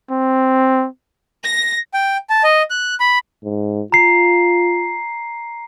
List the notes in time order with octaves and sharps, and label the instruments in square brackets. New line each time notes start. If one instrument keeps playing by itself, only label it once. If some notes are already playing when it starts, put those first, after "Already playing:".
[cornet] C4
[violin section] A#6
[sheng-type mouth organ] G5
A5
D#5
F#6
B5
[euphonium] G#2
[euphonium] F4 [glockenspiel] A#5 C7